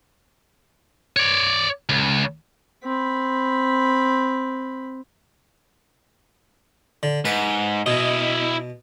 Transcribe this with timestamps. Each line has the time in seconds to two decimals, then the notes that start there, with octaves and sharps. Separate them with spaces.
1.16 C#5 D5
1.89 C#2
2.84 C4 B5
7.03 D3
7.25 G#2 B4
7.86 B2 E4 D#5